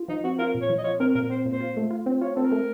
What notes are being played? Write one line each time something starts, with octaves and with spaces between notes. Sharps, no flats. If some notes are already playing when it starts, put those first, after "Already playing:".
Already playing: F4
F3 D#4
C4 F#4
F4 A#4
A#2
C#5
F3
D#5
F4 C#5
C4 A#4
A#2 A#4
C4 C5
A#2
C5
F4
A3
F4
C4
F4 C#5
C4 A4
A#4
A3